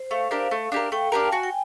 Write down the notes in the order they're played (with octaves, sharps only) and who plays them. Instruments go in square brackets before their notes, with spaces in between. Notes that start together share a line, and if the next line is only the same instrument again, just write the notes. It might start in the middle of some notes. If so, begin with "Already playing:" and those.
Already playing: [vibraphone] C5
[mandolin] A3 [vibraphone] F5
[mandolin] D4 G4 A#4
A3
D4 G4 A#4
[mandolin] A3 [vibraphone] G5
[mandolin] D4 G4 A#4 [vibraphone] A5
[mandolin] F#4 [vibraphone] G#5
[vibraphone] G5